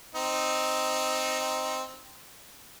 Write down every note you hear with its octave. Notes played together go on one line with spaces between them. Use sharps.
C4 D#4